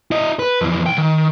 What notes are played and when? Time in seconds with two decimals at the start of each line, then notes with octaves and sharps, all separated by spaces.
0.11 E4 D#5
0.39 B4
0.61 F2 E3
0.86 B1 G5
0.98 D#3